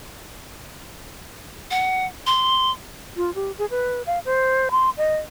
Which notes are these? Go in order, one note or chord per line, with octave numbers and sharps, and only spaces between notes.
F#5
C6
F4
G4
G#4
B4
F5
C5
C6
D#5